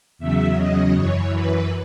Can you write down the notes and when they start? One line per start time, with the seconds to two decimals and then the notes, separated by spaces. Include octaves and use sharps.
0.19 E2 C#3 F#3 E5
0.57 D#5
0.95 F#2 E3 C#5
1.33 B4